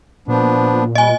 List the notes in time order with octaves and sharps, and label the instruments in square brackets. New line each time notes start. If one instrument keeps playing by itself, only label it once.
[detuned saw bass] A#2 [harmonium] F3 B3 D4
[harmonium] G3 [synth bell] D#5 G#5